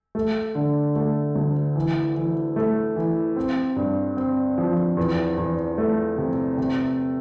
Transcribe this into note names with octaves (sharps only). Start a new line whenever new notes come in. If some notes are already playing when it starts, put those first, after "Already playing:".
A3
D3
A3
D2
E3
E3
A3
E3
C4
G2
C4
F3
E2
E2
A3
C3
C3